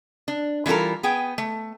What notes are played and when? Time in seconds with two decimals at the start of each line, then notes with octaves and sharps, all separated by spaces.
0.28 D4
0.66 E3 G3 F4 A4 A#4
1.03 B3 G#4 G5
1.38 A3